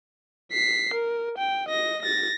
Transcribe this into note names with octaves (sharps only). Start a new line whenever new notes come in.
B6 C7
A#4
G5
D#5 A#6
A6 A#6